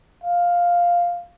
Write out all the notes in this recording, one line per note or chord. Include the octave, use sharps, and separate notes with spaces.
F5